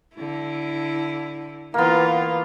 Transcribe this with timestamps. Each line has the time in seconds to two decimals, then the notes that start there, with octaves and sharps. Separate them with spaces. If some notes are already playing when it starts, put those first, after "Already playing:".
0.15 D3 E4
1.74 E3 A#3 B3 F4